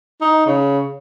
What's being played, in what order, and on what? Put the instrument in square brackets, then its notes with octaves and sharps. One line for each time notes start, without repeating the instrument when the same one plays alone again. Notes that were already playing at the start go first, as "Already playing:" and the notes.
[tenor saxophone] D#4
C#3